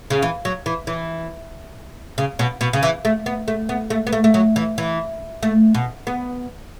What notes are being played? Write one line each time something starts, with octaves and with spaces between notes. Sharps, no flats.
C#3
E3
F#3
E3
E3
C#3
B2
B2
C#3
E3
A3
B3
A3
B3
A3
B3
A3
A3
F#3
E3
E3
A3
B2
B3